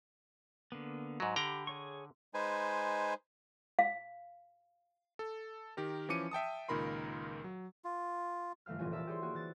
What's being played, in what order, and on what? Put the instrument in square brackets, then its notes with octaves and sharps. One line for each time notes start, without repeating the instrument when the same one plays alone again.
[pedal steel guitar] D3 A#3 B3
[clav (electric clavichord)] G#2 F#3
[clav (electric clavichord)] D3 G5 A#5 [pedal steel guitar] G4 B5
[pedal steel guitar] G#4 C#5 C#6
[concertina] G#3 D#4 B4 C5 G#5
[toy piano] F5
[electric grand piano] A4
D#3 G4 A#4
E3 F3 C#4 D6 C#7 D#7
E5 G5 A5 D#6
C#2 A#2 D#3 A#4 B5 C6
F#3
[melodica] F4
[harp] G1 E3 A3 F5 F6
F1 A#1 E3 C#4 F4 G#5
A#4 D5 E5 A5 D6 E6
G4 G#4 C#5 D5 C6
A#3 C4 F#4 G#4
E3 F#6 A6